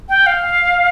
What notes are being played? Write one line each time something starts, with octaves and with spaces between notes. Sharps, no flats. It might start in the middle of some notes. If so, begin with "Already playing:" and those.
G5
F5